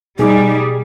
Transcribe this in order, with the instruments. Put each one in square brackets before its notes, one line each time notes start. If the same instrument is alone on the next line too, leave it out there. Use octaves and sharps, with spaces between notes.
[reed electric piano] B2 G4 D6 [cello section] G3 [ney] D#4 [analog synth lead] G#4